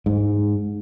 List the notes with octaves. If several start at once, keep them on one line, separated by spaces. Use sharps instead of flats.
G#2